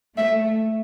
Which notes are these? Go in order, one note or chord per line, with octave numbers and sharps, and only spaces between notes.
A3 E5